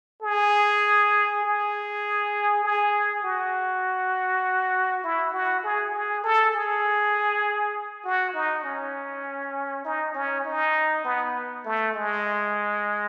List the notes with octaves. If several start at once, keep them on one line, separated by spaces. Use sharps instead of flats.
G#4
G#4
G#4
F#4
E4
F#4
G#4
G#4
A4
G#4
F#4
D#4
C#4
D#4
C#4
D#4
B3
A3
G#3